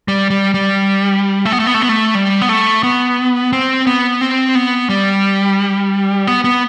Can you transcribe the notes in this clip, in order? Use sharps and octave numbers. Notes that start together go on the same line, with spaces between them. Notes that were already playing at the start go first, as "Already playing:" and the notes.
G3
G3
G3
A3
B3
A3
B3
A3
B3
A3
G3
B3
A3
B3
C4
B3
C4
B3
G3
B3
B3